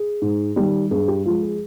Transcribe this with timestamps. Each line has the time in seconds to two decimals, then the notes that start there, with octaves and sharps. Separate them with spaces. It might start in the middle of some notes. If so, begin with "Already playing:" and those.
Already playing: G#4
0.22 G#2
0.56 D#3 G3
0.91 G2 G#4
1.08 G4
1.26 F3 G#3 F4
1.43 G#4